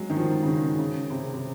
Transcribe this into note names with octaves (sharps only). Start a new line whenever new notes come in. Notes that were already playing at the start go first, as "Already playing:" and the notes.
Already playing: F#3 G#3
D#3
F3
C#3
D#3
C#3
C3
C3